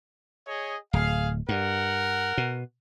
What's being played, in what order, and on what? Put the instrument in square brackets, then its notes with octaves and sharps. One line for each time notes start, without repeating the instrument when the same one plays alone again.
[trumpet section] G#4 C#5 D#5
[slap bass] D1 [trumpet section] G#4 F5
[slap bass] G2 [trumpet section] A#4 F#5
[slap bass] B2